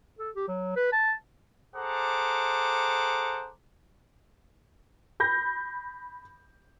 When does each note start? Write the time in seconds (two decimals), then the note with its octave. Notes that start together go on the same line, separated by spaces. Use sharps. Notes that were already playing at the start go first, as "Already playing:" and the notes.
0.19 A4
0.35 G4
0.48 F#3
0.76 B4
0.93 A5
1.76 G#4 A4 C5 F#5 A#5 D6
5.20 B5 G6 A#6